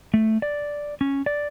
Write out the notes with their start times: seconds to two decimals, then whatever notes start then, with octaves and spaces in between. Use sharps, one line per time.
0.14 A3
0.42 D5
1.01 C#4
1.26 D5